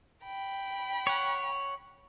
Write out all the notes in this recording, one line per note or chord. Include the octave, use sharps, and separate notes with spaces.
G5 B5
C#5 F#5